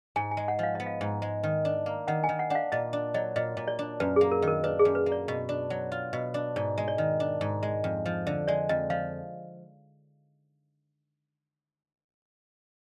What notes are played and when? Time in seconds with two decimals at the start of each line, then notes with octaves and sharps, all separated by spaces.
0.16 G#2 G#5
0.31 G#5
0.37 G#3
0.48 F#5
0.59 F3 F5
0.75 B3 D#5
0.86 F5
1.01 G#2
1.22 G#3
1.43 D#3
1.65 D4
1.86 A#3
2.08 D#3 F#5
2.24 G#5
2.29 D#3
2.39 F#5
2.50 D4 F#5
2.55 F5
2.72 A#2 D#5
2.93 D4
3.14 F#3 D#5
3.36 A#2 D#5
3.57 A#2
3.68 D5
3.79 D4
4.00 F#2 B4
4.16 A#3 G#4
4.32 A#4
4.42 D#3
4.48 A#4
4.64 D4 B4
4.79 G#4
4.85 F#2
4.95 B4
5.06 A#3
5.12 D5
5.28 B2
5.49 D4
5.70 F#3
5.92 F4
6.13 B2
6.34 D4
6.56 G#2 D5
6.78 G#3
6.88 D5
6.98 D#3
7.20 D4
7.41 G#2
7.63 G#3
7.84 F2
8.06 F3
8.27 D3
8.48 G#3 D5
8.69 F2 D#5
8.90 F3 F5